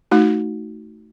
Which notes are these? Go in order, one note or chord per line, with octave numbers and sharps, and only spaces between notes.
A3 D#4 F#4